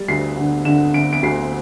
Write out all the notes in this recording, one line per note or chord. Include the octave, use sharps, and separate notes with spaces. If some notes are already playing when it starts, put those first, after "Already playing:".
Already playing: G3 A6
D2 C7
D3
D3 E7
D3 D7
D7
D2 C7